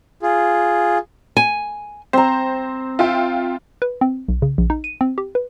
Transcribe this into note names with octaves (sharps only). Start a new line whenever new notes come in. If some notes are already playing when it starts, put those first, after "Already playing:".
F4 G#4
G#5
C4 C5 A#5
F4 E5 G5
B4
C4
B1
C#3
A#1
D#4
D#7
C4
G4
B4